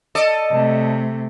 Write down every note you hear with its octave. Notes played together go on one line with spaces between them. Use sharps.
A4 D5 D#5
C3 A3